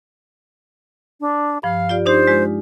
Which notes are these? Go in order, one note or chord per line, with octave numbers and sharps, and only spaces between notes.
D4
G2 F3 F5
F4 G4 D5
D4 D#4 G4 C5
G#3 F4